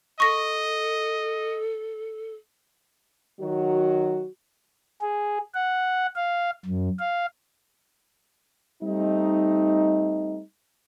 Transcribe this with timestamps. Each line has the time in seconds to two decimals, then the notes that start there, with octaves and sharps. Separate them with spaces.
0.20 A4 D#5 C#6 A#6
3.39 D#3 F#3 F#4
5.02 G#4
5.54 F#5
6.16 F5
6.66 F#2
6.99 F5
8.83 G3 A3 C4 D#4